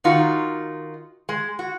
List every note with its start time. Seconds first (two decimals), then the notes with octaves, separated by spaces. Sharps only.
0.04 D#3 D#4 F4 F#4
1.29 G#3
1.59 F#4